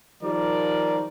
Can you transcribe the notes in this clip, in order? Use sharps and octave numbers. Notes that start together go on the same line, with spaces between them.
D#3 F3 G3 A#4 D5